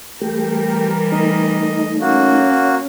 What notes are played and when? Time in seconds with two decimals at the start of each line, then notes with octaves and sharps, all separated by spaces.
0.21 E3 G3 A3 G4 A#4
1.12 A3 D#4 D#5
2.00 A#3 C#4 F#4